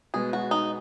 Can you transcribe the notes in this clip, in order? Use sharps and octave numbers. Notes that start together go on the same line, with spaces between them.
B2 G#3 B3 G#4
F#4
D#4